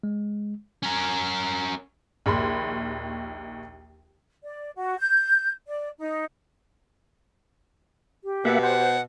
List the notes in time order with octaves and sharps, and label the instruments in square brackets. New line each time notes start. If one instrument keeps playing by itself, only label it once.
[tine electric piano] G#3
[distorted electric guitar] C#4 A#4
[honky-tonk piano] A#1 D#2 B5 C6
[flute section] D5
F#4
G6
D5
D#4
[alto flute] G4
[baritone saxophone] B2 [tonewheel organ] A#3 E5 F#5
[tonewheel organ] C5 [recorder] F#5